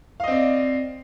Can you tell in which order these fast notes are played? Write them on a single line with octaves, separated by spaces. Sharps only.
F5 D#5 C4 D5